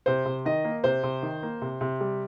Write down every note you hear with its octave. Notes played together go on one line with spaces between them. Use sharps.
C3 C5
C3
D#3 D#5
A#3
C3 C5
C3
D#3
A#3
C3
C3
G3